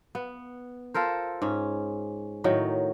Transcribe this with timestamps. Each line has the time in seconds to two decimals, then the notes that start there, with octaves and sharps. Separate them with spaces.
0.15 B3
0.94 F4 A4 A#4 C5
1.42 G#2 C#4
2.44 A2 D#3 F#3 D#4